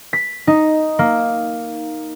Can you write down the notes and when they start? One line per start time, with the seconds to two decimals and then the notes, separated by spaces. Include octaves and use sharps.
0.13 B6
0.47 D#4
0.99 A#3